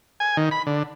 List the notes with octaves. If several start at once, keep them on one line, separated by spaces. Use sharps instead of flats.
G#5
D#3
B5
D3